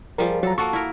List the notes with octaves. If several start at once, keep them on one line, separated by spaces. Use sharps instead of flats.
F3 G3 G#4 A#4
F#3 A4 A#5
A#3 F#4 A4 A5 C#6
E4 A#4